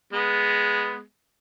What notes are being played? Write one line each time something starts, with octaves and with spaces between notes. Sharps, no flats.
G#3 B3